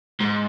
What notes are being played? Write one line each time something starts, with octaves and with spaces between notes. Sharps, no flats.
G#2